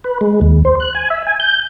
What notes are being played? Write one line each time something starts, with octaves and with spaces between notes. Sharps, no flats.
B4
G#3
D#2
C5
F#6
G#5
E5
G#5
G6